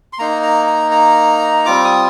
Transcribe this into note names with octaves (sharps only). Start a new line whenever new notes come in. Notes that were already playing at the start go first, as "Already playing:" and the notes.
C6
A#3 D#4 A#5
A#5
A#5
A#5
G3 C4 F4 D6
D#6